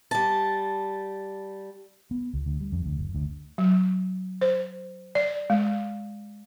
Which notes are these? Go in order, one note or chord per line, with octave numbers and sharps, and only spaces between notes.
G3 A5
B3
C#2
D2
G3
F2
D2
F#1
D2
F#3
C5
D5
G#3